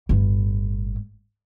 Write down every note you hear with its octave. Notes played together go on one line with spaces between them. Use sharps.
G1 A2